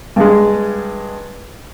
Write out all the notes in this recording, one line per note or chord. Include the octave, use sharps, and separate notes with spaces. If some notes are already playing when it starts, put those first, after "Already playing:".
G2 G#3